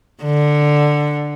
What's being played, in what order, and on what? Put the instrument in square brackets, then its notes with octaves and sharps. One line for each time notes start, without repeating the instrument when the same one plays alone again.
[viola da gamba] D3